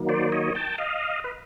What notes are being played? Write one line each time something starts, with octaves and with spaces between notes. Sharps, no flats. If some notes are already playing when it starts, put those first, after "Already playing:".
Already playing: D#3 F#3 A#3
C5 D5
C#5 D#5
G5 A5
D#5 F5
B4